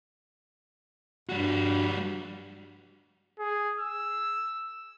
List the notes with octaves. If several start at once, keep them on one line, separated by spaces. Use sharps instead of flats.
G2 G3 F#4
G#4
E6